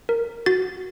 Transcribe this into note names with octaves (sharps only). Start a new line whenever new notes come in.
A#4
F#4 A6